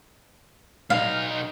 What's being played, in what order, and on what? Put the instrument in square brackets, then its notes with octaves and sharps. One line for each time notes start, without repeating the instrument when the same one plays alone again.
[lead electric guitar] B1 D#4 [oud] F5